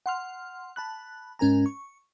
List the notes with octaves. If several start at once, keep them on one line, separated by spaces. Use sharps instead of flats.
F#5 C6 F6
A5 B5 F#6
G#2 C#4 A#4 G#5 A#5
C#6